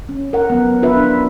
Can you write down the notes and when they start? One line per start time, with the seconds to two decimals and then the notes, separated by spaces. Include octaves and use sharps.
0.09 C#4
0.33 A#4 F#5
0.50 F#3 B3
0.82 D4 F4 B4 E5
0.97 D4